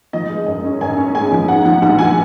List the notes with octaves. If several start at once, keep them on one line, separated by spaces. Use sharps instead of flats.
F3 D#5
G#3
F#2
C#4
F#2 G#5
C#4
G#3 G#5
F3
G#2 F#5
F3 F#5
A#1 F#5
F3 G#5